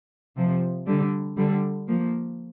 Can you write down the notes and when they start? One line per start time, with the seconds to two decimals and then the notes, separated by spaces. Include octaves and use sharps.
0.37 C3 F3
0.87 D3 G3
1.37 D3 G3
1.88 F3 A#3